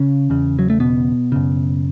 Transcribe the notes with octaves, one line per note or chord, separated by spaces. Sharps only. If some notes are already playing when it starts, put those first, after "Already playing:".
Already playing: C#3 C#4
E2 C#3
F#3
A3
B2 B3
F#2 C#3